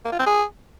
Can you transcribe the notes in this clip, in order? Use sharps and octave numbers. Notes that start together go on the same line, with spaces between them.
A#3
F4
C4
G#4